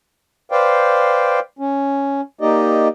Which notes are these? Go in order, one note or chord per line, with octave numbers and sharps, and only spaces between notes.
B4 C5 D5 F5 G5
C#4
A#3 D#4 G4 D5 D#5